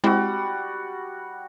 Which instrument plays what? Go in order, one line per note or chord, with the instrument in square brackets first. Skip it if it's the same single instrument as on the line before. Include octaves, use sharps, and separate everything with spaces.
[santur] G3 F#4 [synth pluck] G#3 C4 E4